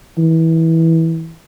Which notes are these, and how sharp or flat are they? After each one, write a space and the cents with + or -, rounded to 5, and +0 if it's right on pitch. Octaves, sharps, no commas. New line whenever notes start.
E3 -20